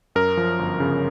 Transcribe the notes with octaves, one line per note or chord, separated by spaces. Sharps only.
F#2 A#4
F3
G1
C#3